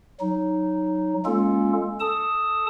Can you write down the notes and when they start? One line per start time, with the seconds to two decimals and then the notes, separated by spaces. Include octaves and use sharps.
0.21 F#3 D#4
1.25 G#3 A#3 C#4 F4 A4
2.00 A4 A5 D#6